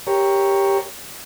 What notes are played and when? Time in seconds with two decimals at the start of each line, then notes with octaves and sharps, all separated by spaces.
0.07 G4 A#4 C#5